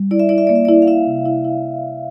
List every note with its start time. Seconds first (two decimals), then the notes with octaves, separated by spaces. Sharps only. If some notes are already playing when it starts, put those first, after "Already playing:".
Already playing: G3
0.11 E4 D5
0.19 E5
0.29 E4 D5
0.38 E5
0.47 A#3 D5
0.56 E5
0.65 D5
0.69 E4
0.82 F5
0.87 E4 E5
1.07 C3
1.26 E4
1.45 E4